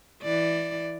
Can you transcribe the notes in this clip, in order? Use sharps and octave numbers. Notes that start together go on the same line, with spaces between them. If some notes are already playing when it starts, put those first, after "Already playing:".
E3 D5